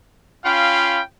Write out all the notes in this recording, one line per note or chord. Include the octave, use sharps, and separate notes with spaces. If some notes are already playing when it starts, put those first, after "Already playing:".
C#4 F4 F5 G5 B5